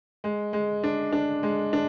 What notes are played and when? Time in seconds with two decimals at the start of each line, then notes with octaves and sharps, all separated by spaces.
0.24 G#3
0.53 G#3
0.84 D4
1.12 D4
1.43 G#3
1.73 D4